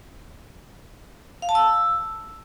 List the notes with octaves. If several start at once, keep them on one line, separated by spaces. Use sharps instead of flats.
F5
A5
E6